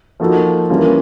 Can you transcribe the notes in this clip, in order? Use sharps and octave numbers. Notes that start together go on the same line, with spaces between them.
F3 A#3 D#4 F#4 A4
E3 G3 A#3 C#4 F4